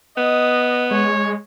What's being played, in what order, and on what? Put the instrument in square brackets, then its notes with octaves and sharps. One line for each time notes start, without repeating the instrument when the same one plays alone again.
[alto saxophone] B3 [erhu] D#5
[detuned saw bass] G#3 [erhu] C#5